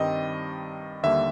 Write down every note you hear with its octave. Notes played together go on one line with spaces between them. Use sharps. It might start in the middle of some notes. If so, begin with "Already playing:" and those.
Already playing: G2 D#3 G3 C4 D#5
D#2 D3 G3 A#3 E5